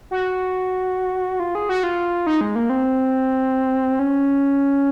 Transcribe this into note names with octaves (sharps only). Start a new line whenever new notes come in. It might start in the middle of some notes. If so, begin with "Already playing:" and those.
F#4
F4
G#4
F#4
F4
D#4
G#3
A#3
C4
C#4